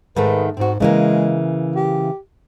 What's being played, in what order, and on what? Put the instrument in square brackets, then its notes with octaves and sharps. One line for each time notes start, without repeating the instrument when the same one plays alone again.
[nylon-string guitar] G#2 D#3 A3 [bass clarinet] B4
[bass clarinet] G#2 [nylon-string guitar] C4 F#4
[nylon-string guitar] C#3 E3 A#3 [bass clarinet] G#3
[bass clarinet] G4